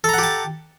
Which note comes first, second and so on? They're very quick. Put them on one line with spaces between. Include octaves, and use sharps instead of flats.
A4 A#5 F#5 G4 A5